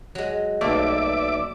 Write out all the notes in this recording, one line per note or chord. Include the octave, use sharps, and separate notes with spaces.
F#3 G#3
B1 A3 A#3 D5 E5 D6